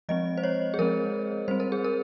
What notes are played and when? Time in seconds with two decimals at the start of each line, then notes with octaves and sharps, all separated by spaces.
0.09 F3 G#3 C4 D#5
0.37 C5
0.44 C#5
0.74 G#4
0.78 F3 G#3 C4 A#4
1.48 G3 C4 C5
1.60 A#4
1.72 G#4
1.84 A#4